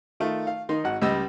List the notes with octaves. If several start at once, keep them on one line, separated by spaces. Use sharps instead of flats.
D#3 A3 F4
F5
D#3 D#4 C6
G#1 F#4 F#5
C#2 G3 D#5 E6